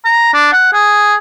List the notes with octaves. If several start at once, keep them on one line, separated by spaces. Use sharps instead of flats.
A#5
D4
F#5
G#4